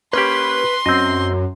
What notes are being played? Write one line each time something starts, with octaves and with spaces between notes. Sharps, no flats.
A#3 C#4 G4 B4 C6
F#2 C4 D#5